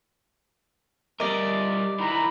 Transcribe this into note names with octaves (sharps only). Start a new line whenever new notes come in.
G3 A#4 D5 D#5
D#3 E3 A#5 B5